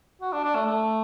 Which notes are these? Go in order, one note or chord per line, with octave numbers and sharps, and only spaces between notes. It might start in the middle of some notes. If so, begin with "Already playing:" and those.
F#4
D4
D4
A3
A3